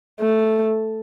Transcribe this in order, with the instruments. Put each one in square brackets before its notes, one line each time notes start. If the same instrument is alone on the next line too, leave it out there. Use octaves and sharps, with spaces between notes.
[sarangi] A3